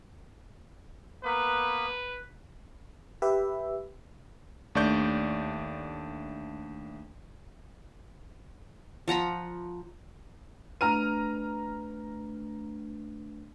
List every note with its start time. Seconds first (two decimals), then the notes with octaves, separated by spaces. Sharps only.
1.24 A#3 B3 B4
3.22 G4 B4 E5
4.75 D#2 A3 D4 D5 C#6 G6
9.08 F3 F#5 A#5 B5
10.81 A3 D4 B4 A#5 F6 D#7